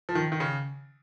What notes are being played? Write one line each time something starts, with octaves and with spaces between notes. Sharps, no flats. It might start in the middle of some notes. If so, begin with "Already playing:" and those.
F3
D#3
D#3
C#3